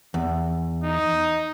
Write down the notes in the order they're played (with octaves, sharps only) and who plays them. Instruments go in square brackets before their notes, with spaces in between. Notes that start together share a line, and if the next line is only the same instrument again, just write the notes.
[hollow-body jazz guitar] E2
[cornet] D#4